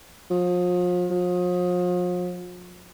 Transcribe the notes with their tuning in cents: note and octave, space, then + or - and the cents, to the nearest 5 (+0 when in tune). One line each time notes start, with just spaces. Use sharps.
F3 +35
F3 +40